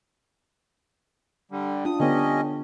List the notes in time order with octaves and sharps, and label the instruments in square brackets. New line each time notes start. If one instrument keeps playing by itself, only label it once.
[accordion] D3 G3
[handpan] D4 F4 [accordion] D#6
[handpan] D3 B3 D4 [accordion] G3 C#4 D#5